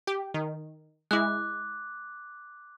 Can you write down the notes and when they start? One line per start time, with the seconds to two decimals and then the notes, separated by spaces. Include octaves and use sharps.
0.07 G4
0.34 D#3
1.11 G#3 E4 D6 F#6